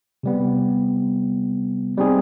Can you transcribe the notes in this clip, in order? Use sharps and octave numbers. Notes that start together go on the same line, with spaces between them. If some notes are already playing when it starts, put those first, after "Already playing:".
C3 G3 B3
G3 C4 D#4 G#4